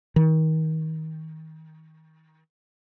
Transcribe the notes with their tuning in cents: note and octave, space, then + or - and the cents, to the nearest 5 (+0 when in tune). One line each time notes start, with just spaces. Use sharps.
D#3 +30